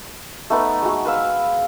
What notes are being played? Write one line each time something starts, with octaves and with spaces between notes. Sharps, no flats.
A3 B3 D#4 B4
G#3 F#4
B4 F5 E6